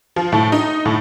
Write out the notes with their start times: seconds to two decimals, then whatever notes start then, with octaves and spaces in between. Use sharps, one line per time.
0.16 F3
0.32 A2
0.52 D#4
0.85 A2